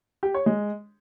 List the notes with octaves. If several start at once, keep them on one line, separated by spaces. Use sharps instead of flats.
G4
C#5
G#3